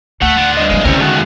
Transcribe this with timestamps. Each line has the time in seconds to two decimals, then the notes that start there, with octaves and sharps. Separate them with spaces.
0.22 D2 A3 F#5
0.37 D4 F4
0.57 G2 D#5
0.70 D#2 F3 G#3
0.85 D3 E3 G3 C4 C#4 A#4 C#5
1.01 A2 D#3 G#3 A3 F#4